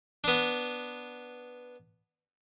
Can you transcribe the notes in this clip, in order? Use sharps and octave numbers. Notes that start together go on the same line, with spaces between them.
B3 D4